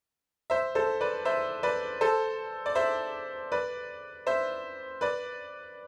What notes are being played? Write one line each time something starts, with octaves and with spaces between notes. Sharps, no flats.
C5 E5
A4 C5
B4 D5
C5 E5
B4 D5
A4 C5
D5
C5 E5
B4 D5
C5 E5
B4 D5